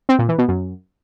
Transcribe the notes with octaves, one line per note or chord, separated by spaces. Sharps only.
C4
A#2
E3
B2
F#2